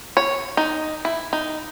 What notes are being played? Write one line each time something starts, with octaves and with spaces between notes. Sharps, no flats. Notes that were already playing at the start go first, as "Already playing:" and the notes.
C#5
D#4
E4
D#4